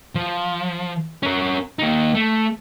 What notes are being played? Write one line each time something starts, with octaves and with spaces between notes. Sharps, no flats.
F3
C#4 A#4
A#3 D#4
A3